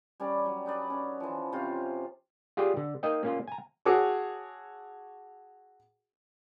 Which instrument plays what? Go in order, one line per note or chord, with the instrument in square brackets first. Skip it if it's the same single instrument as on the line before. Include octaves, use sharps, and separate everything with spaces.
[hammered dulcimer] G3 C#4 D5
F#3
D#4 B4 D5
C#4
E3 F3
C3 C#4 F4
[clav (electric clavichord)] F4 G4 G#4 D5
D3
A#3 D#4 D#5 G5
A#3 C#4 F4
G#5 A#5
[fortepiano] F#4 G#4 A4 C#5 D6